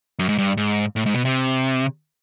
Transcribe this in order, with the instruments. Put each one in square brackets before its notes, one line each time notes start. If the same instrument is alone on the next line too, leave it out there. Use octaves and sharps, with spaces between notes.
[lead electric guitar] F#2
G#2
G2
G#2
A2
G#2
B2
C3